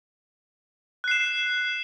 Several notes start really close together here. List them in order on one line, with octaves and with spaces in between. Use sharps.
F#6 C7 E7